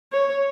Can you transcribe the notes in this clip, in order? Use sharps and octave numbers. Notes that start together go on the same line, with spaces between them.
C#5